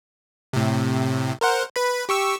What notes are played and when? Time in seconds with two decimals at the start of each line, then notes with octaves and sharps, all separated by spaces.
0.53 A2 C3
1.41 A#4 C5 F#5
1.76 B4 B5
2.09 G4 C#6 E6